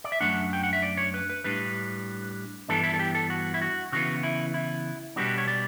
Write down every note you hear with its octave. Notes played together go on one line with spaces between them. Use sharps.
D5
E5
F#2 E3 A3 D4 F#5
G5
F#5
E5
D5
C#5
B4
B4
A2 G3 D4 B4
G2 E3 B3 D4 A4
E4
A4
G4
A4
F#4
E4
F#4
C#3 E3 B3 F#4
E4
E4
B2 G3 B3 D4 F#4
C#5
D5